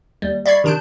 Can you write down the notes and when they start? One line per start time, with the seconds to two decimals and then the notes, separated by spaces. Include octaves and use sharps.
0.22 D#2 G3
0.46 D5 E5 B5 C#6 G#6 C7
0.64 C3 D#3 D4 A5 F#6 G6